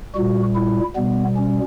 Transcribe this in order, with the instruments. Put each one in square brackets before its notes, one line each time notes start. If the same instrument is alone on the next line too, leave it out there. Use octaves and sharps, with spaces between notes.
[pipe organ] A#2 G3 F#4
E4
B2 G3 B3
C#4